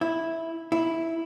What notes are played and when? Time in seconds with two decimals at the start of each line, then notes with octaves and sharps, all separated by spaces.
0.01 E4
0.72 E4